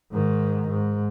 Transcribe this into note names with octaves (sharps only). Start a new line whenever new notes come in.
G#2 D#3
G#2